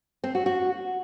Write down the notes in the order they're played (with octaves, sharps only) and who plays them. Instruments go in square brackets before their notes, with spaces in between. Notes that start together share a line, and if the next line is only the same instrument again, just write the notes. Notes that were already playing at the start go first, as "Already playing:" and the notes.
[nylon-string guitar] C4
F#4
F#4